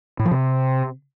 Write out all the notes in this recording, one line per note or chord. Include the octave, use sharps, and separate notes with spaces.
A2
F3
C3